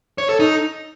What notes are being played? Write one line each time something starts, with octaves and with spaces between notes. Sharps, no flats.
C#5
A4
D#4